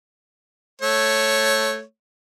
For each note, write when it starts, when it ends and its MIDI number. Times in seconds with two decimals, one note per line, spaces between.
0.82 1.82 57
0.82 1.82 73